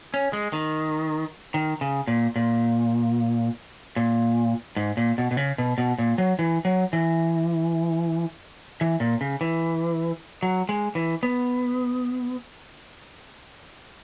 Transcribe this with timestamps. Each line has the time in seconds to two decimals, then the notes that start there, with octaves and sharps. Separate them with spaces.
0.14 C#4
0.33 G#3
0.53 D#3
1.54 D#3
1.81 C#3
2.08 A#2
2.36 A#2
3.96 A#2
4.76 G#2
4.97 A#2
5.18 B2
5.31 B2
5.37 C#3
5.58 B2
5.78 B2
5.98 A#2
6.18 F#3
6.39 E3
6.65 F#3
6.93 E3
8.81 E3
9.00 A#2
9.21 C#3
9.41 E3
10.43 F#3
10.69 G#3
10.95 E3
11.23 B3